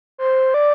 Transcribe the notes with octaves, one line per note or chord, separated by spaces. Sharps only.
C5
D5